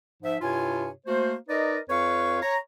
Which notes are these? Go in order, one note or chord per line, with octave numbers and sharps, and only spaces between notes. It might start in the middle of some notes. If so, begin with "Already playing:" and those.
G#2 F3 E5
G2 C3 E4 F4 C#5 G#5
A3 A#3 F#4 C5
D#4 A#4 B4 D5 D#5
F2 F4 B4 C#5 F5 C#6
C#5 A#5